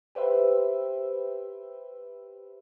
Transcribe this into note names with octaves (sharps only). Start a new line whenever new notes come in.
G4 B4 C5 E5